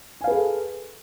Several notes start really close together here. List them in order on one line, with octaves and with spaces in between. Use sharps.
G#5 F5 B4 G#4 A4